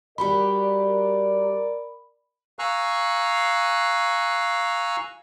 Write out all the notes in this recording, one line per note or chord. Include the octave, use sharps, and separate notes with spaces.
G3 F#4 G4 A#4 D5 B5
F5 G#5 A#5 C#6 E6 F#6